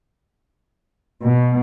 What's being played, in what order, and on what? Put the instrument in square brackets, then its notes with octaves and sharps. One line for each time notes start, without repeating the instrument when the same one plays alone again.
[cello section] B2